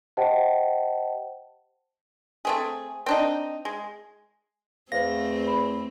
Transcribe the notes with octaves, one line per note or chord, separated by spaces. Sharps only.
G4 C5 D#5 F#5 G5 A5
A3 C4 G#4
C4 D4 D#4
G#3
E2 A3 C4 C5 F5 A#6
B5